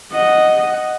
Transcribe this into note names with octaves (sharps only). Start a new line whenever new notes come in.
D#5 F#5